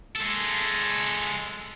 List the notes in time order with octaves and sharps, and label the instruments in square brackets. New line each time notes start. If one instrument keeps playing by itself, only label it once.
[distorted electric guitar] G#3 A4